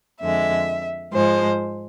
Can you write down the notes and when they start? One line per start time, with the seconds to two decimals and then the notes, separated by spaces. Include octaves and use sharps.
0.20 F2 D3 G#3 E5
1.12 G#2 F3 G#3 C5